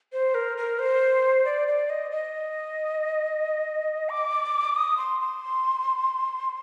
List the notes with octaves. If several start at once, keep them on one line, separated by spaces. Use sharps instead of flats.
C5
A#4
A#4
C5
D5
D5
D#5
D#5
D6
D#6
C6
C6